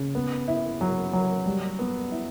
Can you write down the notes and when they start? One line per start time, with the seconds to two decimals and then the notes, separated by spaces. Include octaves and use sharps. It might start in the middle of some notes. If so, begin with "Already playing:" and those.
Already playing: C#3
0.15 B3
0.48 E4
0.81 F#3
1.13 F#3
1.46 G3
1.79 B3
2.12 E4